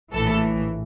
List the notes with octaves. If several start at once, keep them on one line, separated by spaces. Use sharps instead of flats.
A#1 A2 E3 A4